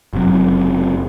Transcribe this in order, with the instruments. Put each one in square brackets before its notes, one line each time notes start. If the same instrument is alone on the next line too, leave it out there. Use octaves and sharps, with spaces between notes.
[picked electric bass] F#1 C3 F#3